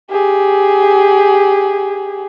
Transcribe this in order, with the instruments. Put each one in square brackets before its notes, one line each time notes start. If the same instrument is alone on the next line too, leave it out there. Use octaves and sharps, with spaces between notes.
[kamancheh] G4 G#4